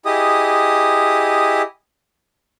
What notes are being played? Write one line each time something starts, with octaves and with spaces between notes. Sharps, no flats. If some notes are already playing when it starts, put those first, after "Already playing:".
E4 G4 G#4 D#5 D#6